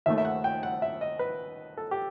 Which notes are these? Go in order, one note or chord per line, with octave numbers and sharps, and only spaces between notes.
D#2 D#3 A3 E5
E5
F#5
G5
F#5
E5
D#5
B4
A4
G4